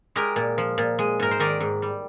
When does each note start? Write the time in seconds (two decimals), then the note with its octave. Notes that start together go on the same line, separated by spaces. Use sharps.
0.16 G#3 G4 A#4
0.36 A#2
0.58 F3
0.78 A#2
0.99 G#3
1.20 G#2 A#4
1.31 C5
1.40 D#3 A#4 D5
1.60 G#2
1.82 G3